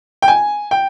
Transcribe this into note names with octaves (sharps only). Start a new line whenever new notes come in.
G5
G#5
G5